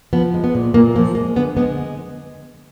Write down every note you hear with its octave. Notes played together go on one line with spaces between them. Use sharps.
F3 B3
G#3
B3
A#2
A#2 A#3
F3 A#3
G#3 A#3
D3 B3
G#3 B3